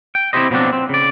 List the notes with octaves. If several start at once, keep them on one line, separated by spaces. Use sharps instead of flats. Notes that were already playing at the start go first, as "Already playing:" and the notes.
G5
C4 E4 F#4 G4 C5 D#5
B2 F3 F#3 A#3 C4 D4
C4
C#3 D5